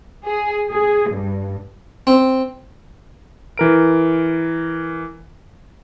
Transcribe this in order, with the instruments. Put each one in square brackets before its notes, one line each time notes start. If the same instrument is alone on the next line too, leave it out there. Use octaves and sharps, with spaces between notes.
[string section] G#4
G#4
G2
[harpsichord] C4
[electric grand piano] E3 A#4 D7